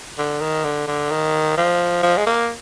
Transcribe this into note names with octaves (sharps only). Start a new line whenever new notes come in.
D3
D#3
D3
D3
D#3
F3
F3
G#3
A#3